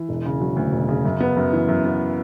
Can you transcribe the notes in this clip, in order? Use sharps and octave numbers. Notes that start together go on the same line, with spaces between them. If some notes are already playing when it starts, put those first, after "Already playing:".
Already playing: E3
E1
C#3
F#3
D2
E1
C#3
F#2
B3
F#2
E3
F#2
B3